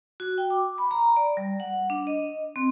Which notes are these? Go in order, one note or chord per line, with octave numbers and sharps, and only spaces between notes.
F#4
G5
D6
B5
A#5
D5
G3
F#5
D4
D#5
C4